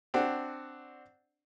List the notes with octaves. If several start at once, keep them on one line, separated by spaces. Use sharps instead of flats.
C4 D4 F#4